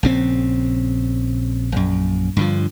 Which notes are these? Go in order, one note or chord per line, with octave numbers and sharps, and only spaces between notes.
A#1 C#3 C4
A#1 F#2
G2 D3 F3